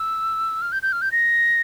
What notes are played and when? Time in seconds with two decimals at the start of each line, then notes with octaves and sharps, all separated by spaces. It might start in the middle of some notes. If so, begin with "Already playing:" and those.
Already playing: E6
0.62 F6
0.72 G6
0.83 G6
0.92 F6
1.02 G6
1.12 A#6